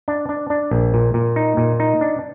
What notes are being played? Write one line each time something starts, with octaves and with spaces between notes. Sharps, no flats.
D4
D4
D4
A#1
A#2
A#2
D#4
A#2
D#4
D4